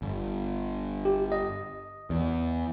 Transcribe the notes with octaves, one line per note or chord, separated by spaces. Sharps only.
G1
G4
D#5
E2